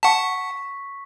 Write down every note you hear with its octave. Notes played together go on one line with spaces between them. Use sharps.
F#5 A5 C#6 B6